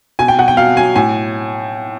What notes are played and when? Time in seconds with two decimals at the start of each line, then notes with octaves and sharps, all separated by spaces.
0.19 B2 G#5
0.28 G5
0.39 B2 F#5
0.48 G5
0.57 F#3 F5
0.76 F#3 G#5
0.95 A2 G#5